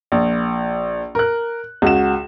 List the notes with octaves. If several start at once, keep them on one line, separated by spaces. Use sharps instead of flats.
A#1
A#4 F#6
C#2 F#4 E7